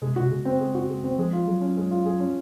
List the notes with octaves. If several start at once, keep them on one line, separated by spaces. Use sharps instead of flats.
C3 G#3
C3 F#4
C#3 G#3
C4
G#3
F#4
G#3
C4
F3 G#3
F4
F#3 G#4
C#4
G#3
F4
G#4
C#4